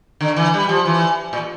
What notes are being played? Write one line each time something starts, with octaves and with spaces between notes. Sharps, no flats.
D3
E3
G3
F3
E3
A#2